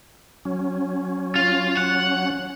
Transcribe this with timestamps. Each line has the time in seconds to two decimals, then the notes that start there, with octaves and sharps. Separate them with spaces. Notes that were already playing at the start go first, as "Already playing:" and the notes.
0.45 F#3 C#4
1.36 F4
1.77 F#5